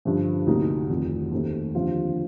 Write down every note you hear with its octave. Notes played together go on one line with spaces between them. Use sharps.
G2 D3 F3
D2 C3 G3 A#3 D#4
F1 F2 D#3
D#2 D#3 A3 C4
D#2 D3 F3 C4 F4